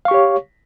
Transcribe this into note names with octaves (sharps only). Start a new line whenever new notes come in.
G4 C#5 F5 C#6